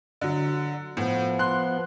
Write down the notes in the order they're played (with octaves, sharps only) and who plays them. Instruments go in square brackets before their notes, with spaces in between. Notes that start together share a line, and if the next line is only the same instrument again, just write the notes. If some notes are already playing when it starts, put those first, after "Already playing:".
[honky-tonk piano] D3 F#3
[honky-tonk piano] A2 [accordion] F3 B3
[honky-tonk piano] C6 F#6